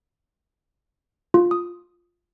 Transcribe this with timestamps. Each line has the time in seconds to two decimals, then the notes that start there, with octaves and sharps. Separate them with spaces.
1.34 F4
1.51 D#6